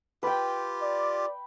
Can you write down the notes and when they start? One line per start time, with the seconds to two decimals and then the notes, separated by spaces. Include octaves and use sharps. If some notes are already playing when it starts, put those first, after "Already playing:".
0.23 F4 G4 B4 G5
0.82 D5